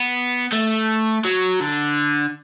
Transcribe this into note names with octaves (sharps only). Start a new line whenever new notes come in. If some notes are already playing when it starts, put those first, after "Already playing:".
Already playing: B3
A3
F#3
D3